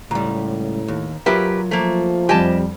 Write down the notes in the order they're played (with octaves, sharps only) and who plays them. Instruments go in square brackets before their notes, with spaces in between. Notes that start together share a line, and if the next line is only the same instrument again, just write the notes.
[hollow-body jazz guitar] C#2 G3 [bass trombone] A2 [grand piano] A#5
[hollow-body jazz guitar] D#2
[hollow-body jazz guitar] F#3 A#4 E5 [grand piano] F4 [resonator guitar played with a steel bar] G4 B4
[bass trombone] F3 [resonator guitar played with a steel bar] A3 A#3
[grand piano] F2 G3 C5 [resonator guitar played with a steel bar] G4 D#5 A5 [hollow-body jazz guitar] G#5